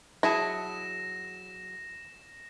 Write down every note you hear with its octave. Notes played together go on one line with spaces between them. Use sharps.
F#3 E4 G#4 A5 A#6 E7